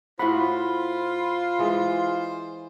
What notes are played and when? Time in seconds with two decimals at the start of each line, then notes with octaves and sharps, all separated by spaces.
0.19 A2 F4 F#4 C5 F#5 B5
1.59 E3 G#3